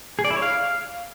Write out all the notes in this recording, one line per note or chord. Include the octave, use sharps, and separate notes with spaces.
G#4
D5
E4
C#5
F5